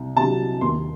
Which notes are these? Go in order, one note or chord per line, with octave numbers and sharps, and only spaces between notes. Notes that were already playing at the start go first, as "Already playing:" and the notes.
Already playing: C2
C3 F#3 A5
D#2 C6